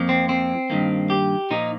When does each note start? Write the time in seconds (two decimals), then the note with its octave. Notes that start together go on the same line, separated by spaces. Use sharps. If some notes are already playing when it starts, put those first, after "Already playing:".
Already playing: F2 F3 A#3
0.09 C4
0.29 C4
0.70 G2 D#3 A#3
1.10 G4
1.51 A#2 F3 A#3 D#4